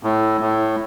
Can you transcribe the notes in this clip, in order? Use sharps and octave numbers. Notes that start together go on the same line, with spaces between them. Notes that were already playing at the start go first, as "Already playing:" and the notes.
A2
A2